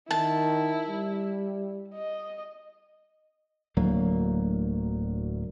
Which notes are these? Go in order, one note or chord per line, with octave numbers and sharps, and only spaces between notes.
D#3 E4 A5
G3
D#5
D1 D2 F#3 A#3